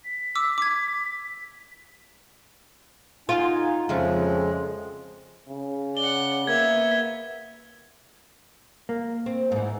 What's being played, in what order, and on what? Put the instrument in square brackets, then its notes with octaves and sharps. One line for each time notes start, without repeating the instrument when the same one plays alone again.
[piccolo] B6
[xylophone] D6 E6
D6 G#6
[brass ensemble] D#4 F#5 G#5 [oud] F4
[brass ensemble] F2 [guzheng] C#3 F3 A3 [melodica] G#3
[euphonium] C#3
[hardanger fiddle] D5 F#5 [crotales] G7
[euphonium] A#3 [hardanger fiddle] B3 E5 [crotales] G#6
[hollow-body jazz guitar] A#3
[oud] C4
G#2 E3